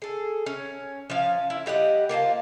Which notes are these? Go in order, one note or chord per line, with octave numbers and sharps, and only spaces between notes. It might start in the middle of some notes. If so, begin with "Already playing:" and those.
G#4 A4
C#4
F3 C#4 F5
E4
G3 G4 D#5 F#5
A#3 F4 C5 A5